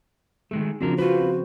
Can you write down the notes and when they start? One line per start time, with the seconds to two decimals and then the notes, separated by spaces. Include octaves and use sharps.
0.51 D#3 G#3 A3 G#4
0.81 C#3 F3 C4 D4 F#4 A#4
0.98 C4 F4 F#4 B4 C5
1.21 C4